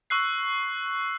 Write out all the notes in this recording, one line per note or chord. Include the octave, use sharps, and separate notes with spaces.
C#6 E6 F#6 C7